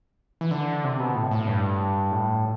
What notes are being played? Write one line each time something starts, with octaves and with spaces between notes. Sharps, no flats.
E3
D3
C3
B2
A2
A2
G2
A2